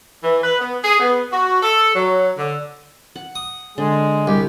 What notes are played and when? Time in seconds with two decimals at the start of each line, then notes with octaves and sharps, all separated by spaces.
0.24 E3
0.44 B4
0.59 B3
0.84 G#4
1.00 B3
1.32 F#4
1.63 A4
1.95 F#3
2.38 D3
3.16 F#5
3.35 D#6
3.78 D3 G#3 G#4
4.27 C2 G4